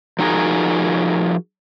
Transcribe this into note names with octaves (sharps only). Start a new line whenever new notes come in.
F3 D#4 F#4 G#4 A#4